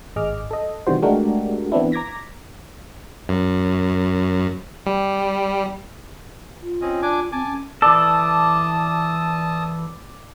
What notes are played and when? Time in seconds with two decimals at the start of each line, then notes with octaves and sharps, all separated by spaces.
0.16 G#1 G#4 D#5 D6 F6
0.51 A4 D#5
0.87 C3 D#3 E3 G3 F#4 C5
1.02 G#3 A3 D4 F#4 G4 A#4
1.72 E3 B3 C4 D4 E4
1.92 A#5 D6 G#6 A#6 B6
3.29 F#2
4.86 G3
6.61 F4
6.81 C4 C#4 D#5
7.02 D4 G#5 D6
7.32 C4 G#5 A5 D6
7.46 C#4
7.82 E3 A4 D5 A5 D#6